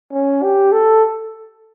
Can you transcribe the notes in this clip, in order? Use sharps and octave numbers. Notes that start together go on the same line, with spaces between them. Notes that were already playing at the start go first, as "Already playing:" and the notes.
C#4
G4
A4